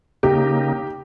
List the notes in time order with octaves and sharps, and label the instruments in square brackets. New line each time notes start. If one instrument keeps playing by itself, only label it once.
[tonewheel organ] C#3 A#3 D#4 [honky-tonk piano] G4